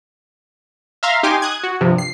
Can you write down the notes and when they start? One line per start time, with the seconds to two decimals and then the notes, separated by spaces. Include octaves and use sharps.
1.03 E5 F5 A#5 C6 F6
1.23 D#4 G4 G#5 C6 D6
1.42 D#6 F#6 G#6
1.63 F#4
1.81 G2 C3 F3
1.98 C7